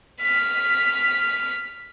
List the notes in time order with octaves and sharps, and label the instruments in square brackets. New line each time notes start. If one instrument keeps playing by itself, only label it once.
[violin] F6 B6